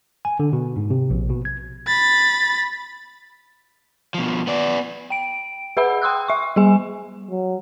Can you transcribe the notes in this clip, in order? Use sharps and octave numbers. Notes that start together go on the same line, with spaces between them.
G#5
D3
B2
G#2
C3
A#1
B2
G#6
B5 A6
B2 F3
B3 D5
G5 D7
G#4 B4 E5 F#5 B5 E6
G5 C6 D#6 E6 F#6
E5 C#6
G3 G#4 G#5
F#3